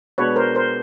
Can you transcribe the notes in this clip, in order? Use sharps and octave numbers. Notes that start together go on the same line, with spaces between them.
B2 G#3 B3 D4 B4 C#5
A#4 C5
A#4 C5